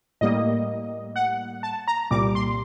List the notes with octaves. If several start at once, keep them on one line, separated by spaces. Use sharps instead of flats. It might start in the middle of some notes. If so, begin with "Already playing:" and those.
A2 G3 A#3 D#5
F#5
A5
A#5
C2 A#2 G3 D6
C6